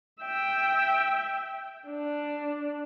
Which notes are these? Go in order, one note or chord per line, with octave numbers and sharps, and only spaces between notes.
E5 G5
D4